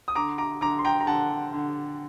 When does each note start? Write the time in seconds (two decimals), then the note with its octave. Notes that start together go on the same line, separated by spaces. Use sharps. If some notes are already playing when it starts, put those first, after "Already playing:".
0.08 D#6
0.15 D3 A#5 D6
0.38 A#5 D6
0.61 D3 A#5 D6
0.79 C6
0.85 G5 A#5
1.00 A#5
1.06 D3 F#5 A5
1.53 D3